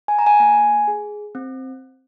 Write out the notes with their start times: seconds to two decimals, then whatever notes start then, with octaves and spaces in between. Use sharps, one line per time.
0.08 G#5
0.19 A#5
0.27 G#5
0.40 A#3
0.88 G#4
1.35 C4